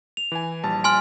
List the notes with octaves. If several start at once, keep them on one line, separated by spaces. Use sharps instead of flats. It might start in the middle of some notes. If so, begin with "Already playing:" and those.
F7
E3 G#5
A#1 G3 A5
G#5 C6 F6